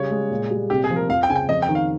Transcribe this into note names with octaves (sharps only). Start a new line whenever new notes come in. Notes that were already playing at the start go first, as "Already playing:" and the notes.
Already playing: C#3 G3 C#5
G#3
A#2
G3
C3 G4
G#4
F3
A#4
F2 F5
G5
C#3 G#5
G5
F2 D#5
G5
D#3
F5